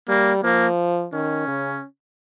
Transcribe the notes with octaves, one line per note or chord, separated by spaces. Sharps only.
G3 A#3
F3 A#3
D#3 C#4
C#3